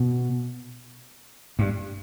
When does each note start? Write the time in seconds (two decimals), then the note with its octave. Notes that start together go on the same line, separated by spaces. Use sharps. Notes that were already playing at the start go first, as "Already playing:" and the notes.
Already playing: B2
1.59 G2